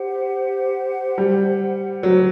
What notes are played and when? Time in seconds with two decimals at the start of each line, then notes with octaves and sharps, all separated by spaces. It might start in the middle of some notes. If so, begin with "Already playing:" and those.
Already playing: G4 C5 F#5
1.18 G3
2.03 F#3